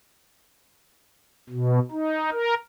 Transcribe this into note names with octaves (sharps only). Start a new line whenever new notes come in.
B2
D#4
A#4